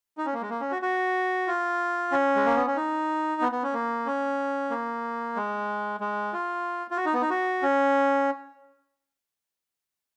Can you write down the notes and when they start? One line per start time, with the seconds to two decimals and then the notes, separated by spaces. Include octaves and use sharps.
0.18 D#4
0.26 C#4
0.33 A#3
0.41 G#3
0.50 A#3
0.61 C#4
0.72 F#4
0.82 F#4
1.47 F4
2.12 C#4
2.36 G#3
2.46 A#3
2.56 B3
2.67 C#4
2.76 D#4
3.41 B3
3.52 B3
3.63 C#4
3.74 A#3
4.06 C#4
4.70 A#3
5.36 G#3
6.00 G#3
6.33 F4
6.91 F4
6.97 F#4
7.05 D#4
7.14 B3
7.21 D#4
7.30 F#4
7.62 C#4